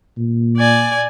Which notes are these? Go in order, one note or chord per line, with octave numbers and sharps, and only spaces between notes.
A#2
D5 G#5